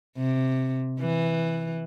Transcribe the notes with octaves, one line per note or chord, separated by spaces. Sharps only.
C3
E3